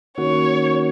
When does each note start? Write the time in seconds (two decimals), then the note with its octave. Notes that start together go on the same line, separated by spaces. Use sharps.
0.18 D#3 A#3 C#4 F#4 C#5